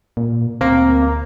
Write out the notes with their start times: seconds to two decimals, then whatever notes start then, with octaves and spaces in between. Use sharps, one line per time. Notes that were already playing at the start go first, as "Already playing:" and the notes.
0.17 A#2
0.61 D2 A#3 C4 A#4 A#5